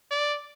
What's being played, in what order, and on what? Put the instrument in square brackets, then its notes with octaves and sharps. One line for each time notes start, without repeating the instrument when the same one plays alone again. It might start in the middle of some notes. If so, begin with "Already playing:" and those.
[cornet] D5